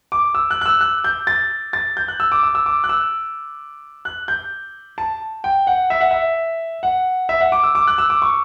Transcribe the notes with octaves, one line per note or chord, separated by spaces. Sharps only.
D6
E6
F#6
F#6
E6
F#6
G6
A6
A6
G6
F#6
E6
D6
E6
E6
D6
F#6
E6
F#6
G6
A5
G5
F#5
E5
F#5
E5
F#5
E5
F#5
D6
E6
D6
F#6
E6
D6
C#6